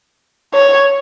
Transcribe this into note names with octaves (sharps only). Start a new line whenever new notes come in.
C#5